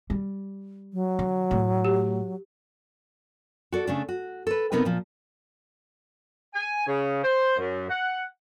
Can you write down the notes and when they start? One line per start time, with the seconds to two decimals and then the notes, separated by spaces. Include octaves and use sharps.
0.10 G3
0.93 F#3
1.19 D3
1.51 A2 A3
1.85 G4
3.72 F#4 A4 D5
3.87 C#3 A3 D4
4.09 F#4
4.47 A4 B4
4.72 C3 B3 D#4 A#4 B4
4.85 A#2 F3
6.54 G#5
6.86 C#3
7.22 C5
7.57 F#2
7.89 F#5